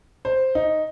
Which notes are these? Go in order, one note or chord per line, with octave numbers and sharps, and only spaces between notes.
C5
D#4